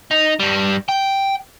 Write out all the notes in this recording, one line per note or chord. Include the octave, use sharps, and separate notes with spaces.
D#4
G2 G3
G5